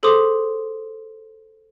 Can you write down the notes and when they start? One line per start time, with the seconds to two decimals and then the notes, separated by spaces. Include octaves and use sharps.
0.03 G#4 A4 C5 C6 D6 D#6